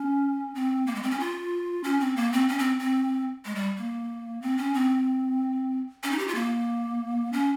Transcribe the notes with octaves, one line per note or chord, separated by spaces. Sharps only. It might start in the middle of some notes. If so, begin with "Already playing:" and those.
Already playing: C#4
C4
A#3
G#3
C4
C#4
F4
C#4
C4
A#3
C4
C#4
C4
C4
G#3
G3
A#3
C4
C#4
C4
C#4
D#4
G4
F4
A#3
C#4